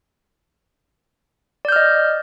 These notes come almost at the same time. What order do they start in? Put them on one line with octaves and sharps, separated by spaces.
D5 G6 F6 D#5